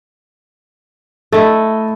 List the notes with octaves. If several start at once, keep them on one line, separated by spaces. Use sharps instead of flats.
A3 E4 A4 D#5